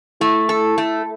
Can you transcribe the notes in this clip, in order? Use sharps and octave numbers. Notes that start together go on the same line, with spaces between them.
A3 E4
A4
A3